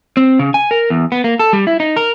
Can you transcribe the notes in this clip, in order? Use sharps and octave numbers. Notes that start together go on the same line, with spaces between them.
C4
C#3
G#5
A#4
E2
B3
A#3
A4
G3
E4
D#4
A#4